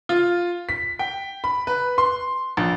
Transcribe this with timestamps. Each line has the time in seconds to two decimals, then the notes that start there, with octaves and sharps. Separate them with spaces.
0.09 F4
0.69 B6
0.99 G5
1.44 B5
1.67 B4
1.98 C6
2.57 A#1